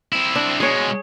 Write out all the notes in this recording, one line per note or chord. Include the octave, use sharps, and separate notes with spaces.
C4 E4
D4
B2 G#3 G#4 C#5